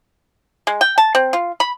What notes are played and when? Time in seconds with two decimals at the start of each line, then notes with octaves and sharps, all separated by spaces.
0.67 G#3
0.81 G5
0.98 A5
1.15 C4
1.33 F4
1.60 B5